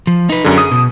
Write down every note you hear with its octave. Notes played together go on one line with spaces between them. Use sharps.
F3
D#4 B4
F#2 D3 G#4
D#6
B2